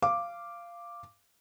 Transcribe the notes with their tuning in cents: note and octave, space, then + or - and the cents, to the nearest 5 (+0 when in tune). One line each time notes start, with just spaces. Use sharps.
F5 -15 D6 +0